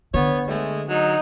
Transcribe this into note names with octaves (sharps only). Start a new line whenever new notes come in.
D3 B3 C#5
G#3 A3
F#3 D#4